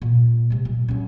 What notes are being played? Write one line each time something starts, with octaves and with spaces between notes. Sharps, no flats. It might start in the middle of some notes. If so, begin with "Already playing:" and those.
A#2
C3 G#3
A#2
F#2 C#4